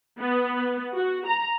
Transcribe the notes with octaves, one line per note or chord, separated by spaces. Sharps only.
B3
F#4
A#5